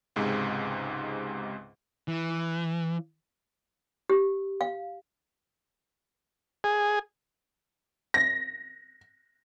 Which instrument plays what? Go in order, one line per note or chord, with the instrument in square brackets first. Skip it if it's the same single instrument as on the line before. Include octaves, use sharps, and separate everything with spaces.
[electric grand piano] C#2 G#2 C3 G#3
[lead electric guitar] E3
[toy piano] G4
F5
[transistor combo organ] G#4
[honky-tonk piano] A#6